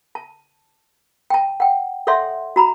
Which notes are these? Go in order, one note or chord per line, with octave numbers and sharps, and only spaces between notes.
A5
G5 A5
F#5 G5
A4 C#5 D5 E5 F#5 C6
F#4 A#5 B5